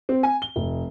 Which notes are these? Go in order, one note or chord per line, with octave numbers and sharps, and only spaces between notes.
C4
G#5
G7
F1